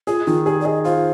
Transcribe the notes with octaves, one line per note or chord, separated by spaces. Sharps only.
F4 G#4
D#3 F4
G4 G#4
D5
G#4 D#5
F4 C5